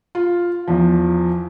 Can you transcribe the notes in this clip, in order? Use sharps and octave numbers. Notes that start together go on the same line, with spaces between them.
F4
E2 F3